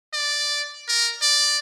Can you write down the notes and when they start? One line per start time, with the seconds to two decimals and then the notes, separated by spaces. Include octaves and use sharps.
0.14 D5
0.89 A#4
1.22 D5